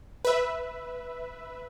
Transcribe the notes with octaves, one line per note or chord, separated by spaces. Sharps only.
B4 E5